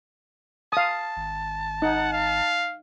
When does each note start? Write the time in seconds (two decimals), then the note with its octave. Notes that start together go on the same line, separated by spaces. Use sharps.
0.73 F5 A5 D#6
1.17 G#1
1.82 D#4 F#5
2.13 F5